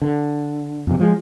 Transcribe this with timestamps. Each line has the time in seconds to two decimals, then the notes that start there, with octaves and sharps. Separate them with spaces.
0.02 D3
0.87 F2 C3
0.99 F3 F#3 G#3